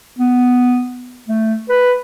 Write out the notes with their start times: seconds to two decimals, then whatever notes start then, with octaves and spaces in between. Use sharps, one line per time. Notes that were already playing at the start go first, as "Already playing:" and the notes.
0.18 B3
1.28 A3
1.69 B4